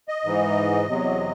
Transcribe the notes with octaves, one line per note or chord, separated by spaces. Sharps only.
D#5
G#2 E3
E2 C3 F#3